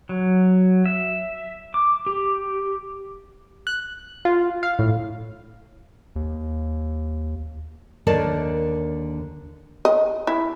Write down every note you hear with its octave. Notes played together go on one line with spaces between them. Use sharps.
F#3
E5
D6
G4
F#6
F4
F5
A2
D#2
D#2 D3 A#4 C#5 D5 A5
D#5
E4